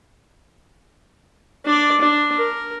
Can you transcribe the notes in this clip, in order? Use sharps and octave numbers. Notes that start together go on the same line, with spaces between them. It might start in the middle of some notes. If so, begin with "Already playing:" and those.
D4 D5
D4
A#4